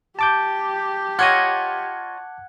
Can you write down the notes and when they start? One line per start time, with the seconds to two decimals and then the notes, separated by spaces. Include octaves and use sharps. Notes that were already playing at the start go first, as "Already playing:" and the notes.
0.19 G4 A5 D6 G6
1.19 F4 C#5 D#5 F#5 F#6 G#6